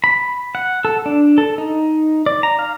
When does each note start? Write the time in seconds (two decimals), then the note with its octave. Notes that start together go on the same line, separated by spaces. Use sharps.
0.04 B5
0.55 F#5
0.85 A4
1.06 D4
1.38 A4
1.58 D#4
2.26 D5
2.43 A#5
2.59 F5